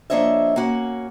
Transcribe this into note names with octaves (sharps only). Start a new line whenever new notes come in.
F3 A#3 D4 C#5 D#5 E5
A#3 C#4 F#4